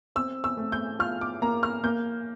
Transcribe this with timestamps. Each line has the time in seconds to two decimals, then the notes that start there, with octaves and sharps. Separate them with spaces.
0.16 C4 E6
0.44 E6
0.57 A3
0.72 G6
0.99 F4 F6
1.21 D6
1.42 A#3 A#5
1.63 F6
1.83 A#3 G6